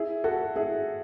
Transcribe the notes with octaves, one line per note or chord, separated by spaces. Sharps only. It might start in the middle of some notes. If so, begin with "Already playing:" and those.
Already playing: E4 G#4
F#4 A4
E4 G#4